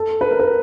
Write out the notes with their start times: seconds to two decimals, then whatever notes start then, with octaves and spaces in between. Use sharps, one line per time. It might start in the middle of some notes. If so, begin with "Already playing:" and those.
Already playing: A4
0.21 B4
0.31 A#4
0.39 B4